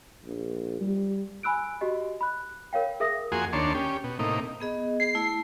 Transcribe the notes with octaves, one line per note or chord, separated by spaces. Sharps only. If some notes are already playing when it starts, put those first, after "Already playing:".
A#1
G3
G#5 B5 E6 F#6 D7
F#4 G4 D#5
B5 F#6
A#4 C#5 F5 G5
G#4 A#4 E5 D#6 A#6
F2 A#3 F#4 G#4 G#5 C6
D#2 A#3 D4 C#5 A5 C6
C#4 G4
B2
A2 C3 A#3 D#4
B3 G#4 D#5
G#4 C7
A3 E4